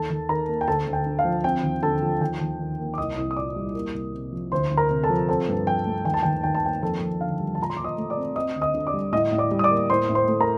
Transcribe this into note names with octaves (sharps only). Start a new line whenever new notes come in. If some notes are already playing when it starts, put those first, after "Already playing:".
Already playing: D#2 A4 A5
D#2
D#3 A#4 A#5
A#3
G5
D2 A4 A5
D2
G5
D3
F5
F3
C4 G5
D#2
D3 A4 A5
F3
D#2 G5
D#2
D#3
A#3
D6
C2 D#5 D#6
C2
D#6
A#2 D5 D6
G3
A#3
C2
C3
F3
D2 C5 C6
D2
A#4 A#5
C3
A4 A5
F3
C4 A4 A5
G2
F3 G5
A3
D#2 G5
A5
D#2 G5
D#3 G5
A5
A#3 G5
F2 A4 A5
F2
D3 F5
G3
A5
A#2 A#5
C6
A#2 D6
D#5 D#6
A3
D5 D6
C4
C4 D#5 D#6
D2
D#5 D#6
D3
D5 D6
G3
A2 D#5 D#6
A2
D5 D6
G3
D#6
D5 D6
A#3
A2 C5 C6
A2
C5 C6
A3
A#4 A#5